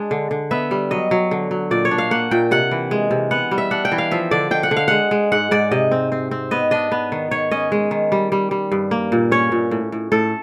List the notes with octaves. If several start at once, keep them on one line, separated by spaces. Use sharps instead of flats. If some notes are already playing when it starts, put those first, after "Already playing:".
Already playing: G#3 D4
D3
D3
B3 E5
G3
F#3 D#5
F#3
D3
F#3
A#2 D5
C#5
D4
F5
A#3 F#5
A#2 G5
C3 F#5
E3
G#3
C3
B3 F#5
G3
E5
D4 F#5
G5
E3
F5
F3 E5
D3 D5
D3 G5
F#5
D3
F5
G#3 F#5
G#3
G#2 F#5
G#2 D5
C3 D#5
C4
C4
C4
B3 D#5
D4 D#5
B3
D#3
D#3 C#5
C#4 D#5
G#3
D#3
G3
G3
G3
G2
A#3
A#2
C#4 C#5
A#2
A2
A2
A2 A4